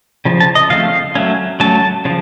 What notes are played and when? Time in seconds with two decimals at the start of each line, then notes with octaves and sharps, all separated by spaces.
0.25 C#3 F3
0.40 A5
0.55 D#5
0.70 C#3 F3 A3 C4 F5
1.15 F#3 A3 C#4
1.60 F#3 A3 C#4 A5
2.05 C#3 F3